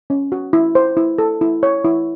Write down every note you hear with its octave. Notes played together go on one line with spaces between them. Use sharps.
C#4
F#4
E4
C5
E4
A4
E4
C#5
E4